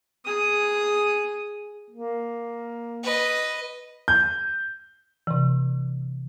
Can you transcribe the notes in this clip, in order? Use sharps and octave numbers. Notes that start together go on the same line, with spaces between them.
G#4 D#6
A#3
B4 D#5
G6
C3 E3